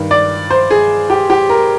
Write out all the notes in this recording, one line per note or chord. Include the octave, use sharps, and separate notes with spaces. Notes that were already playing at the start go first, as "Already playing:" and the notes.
Already playing: G2 D#3
D5
C5
G#4
G4
G4
A#4